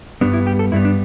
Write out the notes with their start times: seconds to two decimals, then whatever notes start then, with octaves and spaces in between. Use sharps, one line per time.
0.21 G2 G3 B3 D4
0.33 E4
0.47 G4
0.59 A4
0.72 G2 G3 B3 E4
0.85 D4